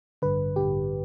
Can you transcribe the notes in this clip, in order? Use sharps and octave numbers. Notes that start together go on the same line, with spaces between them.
A1 G2 D3 B4
A1 G2 D3 G4